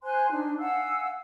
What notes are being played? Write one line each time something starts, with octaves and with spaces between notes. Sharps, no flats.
C5 G#5 C6 F#6
D4 D#4
F5 F#5 G#5 E6